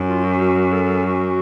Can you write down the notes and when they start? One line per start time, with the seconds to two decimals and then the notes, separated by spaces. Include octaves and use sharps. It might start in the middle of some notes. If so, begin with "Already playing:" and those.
Already playing: F#2
0.09 F4
0.25 F#4
0.41 F#4
0.72 A4
1.05 F#4